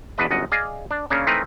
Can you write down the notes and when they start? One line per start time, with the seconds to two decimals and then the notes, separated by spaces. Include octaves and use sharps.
0.18 E2 B2 D4 B4 D#5
0.31 G1 F#2 D#5 F#5
0.52 G#4 D5 D#5 F5
0.91 D4
1.10 C#3 A#3 C#4 D4
1.27 E3 A3 C4 D#4 A#4 B4